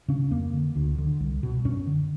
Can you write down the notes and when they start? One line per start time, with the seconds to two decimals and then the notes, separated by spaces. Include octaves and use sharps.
0.08 C#3 C#4
0.31 F2 A#3
0.53 D3
0.76 D2
0.98 D3
1.20 C2
1.43 B2
1.65 F#2 C#4
1.87 D3